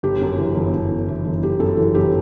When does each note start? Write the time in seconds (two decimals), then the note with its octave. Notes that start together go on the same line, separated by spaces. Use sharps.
0.03 G1 G4
0.21 F#2
0.38 E3
0.55 G1
0.74 G1
0.91 F#2
1.08 E3
1.25 G1
1.43 G1 G4
1.60 F#2 A4
1.77 E3
1.95 G1 G4